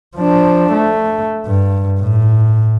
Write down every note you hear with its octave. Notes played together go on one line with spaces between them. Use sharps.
F3 D4
A3
G2
A2